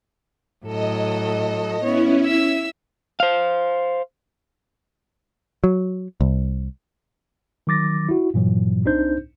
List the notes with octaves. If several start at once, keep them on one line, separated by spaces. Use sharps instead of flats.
A2 F#3 A4 D#5
B3 C#4 E4 C#5
E5 E6
C5 F5
F#3
C2
D#3 F#3 D6 A6 A#6
E4 F#4
G2 A#2 E3 F#3
C2 C4 D4 D#4 C5 G6